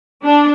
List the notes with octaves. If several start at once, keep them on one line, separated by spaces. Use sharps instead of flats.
D4